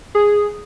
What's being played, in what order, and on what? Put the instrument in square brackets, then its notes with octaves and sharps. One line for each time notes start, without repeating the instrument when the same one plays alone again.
[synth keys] G#4